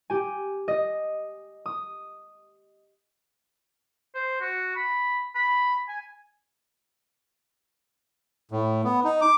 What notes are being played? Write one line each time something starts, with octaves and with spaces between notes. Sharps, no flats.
G4 G#5
D#5
D#6
C5
F#4
B5
B5
G#5
A2
B3
D#4
D6